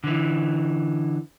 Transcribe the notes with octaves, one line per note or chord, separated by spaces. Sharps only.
D3 E3